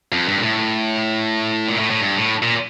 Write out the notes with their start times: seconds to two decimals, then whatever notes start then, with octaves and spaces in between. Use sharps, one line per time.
0.12 F2
0.28 G2
0.38 A#2
0.44 A2
1.69 A#2
1.79 A2
1.90 A2
2.01 G2
2.17 A2
2.42 A#2